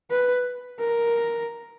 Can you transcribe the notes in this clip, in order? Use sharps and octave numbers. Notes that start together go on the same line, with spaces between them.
B4
A#4